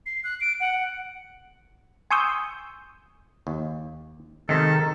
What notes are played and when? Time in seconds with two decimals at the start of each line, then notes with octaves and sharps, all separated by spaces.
0.06 C7
0.24 F#6
0.41 D7
0.60 F#5
2.11 G#5 C6 C#6 D#6 E6 G6
3.47 D#2
4.49 C3 D#3 G#3 A4